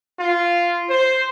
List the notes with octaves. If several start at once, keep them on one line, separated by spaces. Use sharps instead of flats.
F4
C5